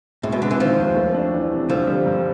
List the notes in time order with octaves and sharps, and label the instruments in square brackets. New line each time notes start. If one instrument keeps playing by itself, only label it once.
[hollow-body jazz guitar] A2 [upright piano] G#3
[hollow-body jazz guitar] B2
[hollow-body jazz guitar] D3 [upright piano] C4
[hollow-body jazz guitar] E3
[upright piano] D#3 [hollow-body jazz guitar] F3
[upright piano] D#2
A3
D4
E3
C3
[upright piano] D3 [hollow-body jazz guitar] F3
[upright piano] G3
G2